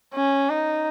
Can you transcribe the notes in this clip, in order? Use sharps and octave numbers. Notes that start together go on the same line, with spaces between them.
C#4
D#4